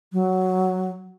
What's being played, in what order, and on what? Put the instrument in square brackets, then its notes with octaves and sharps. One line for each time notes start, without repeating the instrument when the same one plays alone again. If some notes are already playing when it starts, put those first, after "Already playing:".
[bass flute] F#3